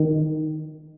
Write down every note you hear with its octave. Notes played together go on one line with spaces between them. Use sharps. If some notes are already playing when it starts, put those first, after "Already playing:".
Already playing: D#3